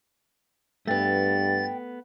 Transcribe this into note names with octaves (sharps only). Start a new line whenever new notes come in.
G2 A3 B3 G5 A6